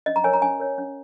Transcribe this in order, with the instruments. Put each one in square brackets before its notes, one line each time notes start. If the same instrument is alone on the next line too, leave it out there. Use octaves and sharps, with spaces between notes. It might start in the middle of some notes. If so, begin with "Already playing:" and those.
[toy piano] C#4 D#5
A#5
A#4 C#5 G#5
A#5
C#4 G#5
A#4 C#5
C#4